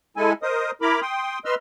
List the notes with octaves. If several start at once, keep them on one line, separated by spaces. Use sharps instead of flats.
G#3 E4 A4 G#5
A#4 C5 D#5 D#6
E4 A#4 A#5 B5 D6
G5 C6 D#6
B4 D#5 C6 E6 F6